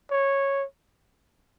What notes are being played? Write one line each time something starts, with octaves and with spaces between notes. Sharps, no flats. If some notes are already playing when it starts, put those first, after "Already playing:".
C#5